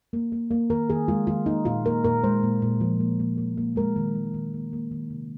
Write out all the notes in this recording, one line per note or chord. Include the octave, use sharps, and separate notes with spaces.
A#3
A#3
A#3
D#3 A#4
D#3 G#4
G#3 F4
D#3 F4
A#3 D#4
A#2 F4
A#3 A#4
A#2 A#4
G#3 C5
A#2
A#2
F3
A#3
A#3
A#3
A#3
G#3 A#4
D#3
G#3
D#3
A#3
A#3
D#3
C3